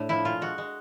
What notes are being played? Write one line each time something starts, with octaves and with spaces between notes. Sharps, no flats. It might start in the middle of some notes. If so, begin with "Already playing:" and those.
Already playing: A2 A3 D4
F3 E4
A#2 F4
G#3 F#4
G#3